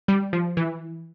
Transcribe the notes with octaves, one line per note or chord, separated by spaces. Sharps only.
G3
F3
E3